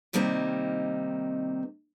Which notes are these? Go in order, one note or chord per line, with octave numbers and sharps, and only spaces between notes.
C3 D#3 G3 A#3 C4 D#4